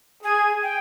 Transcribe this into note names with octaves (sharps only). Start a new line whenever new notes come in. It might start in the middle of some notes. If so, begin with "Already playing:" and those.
G#4 G#5
G5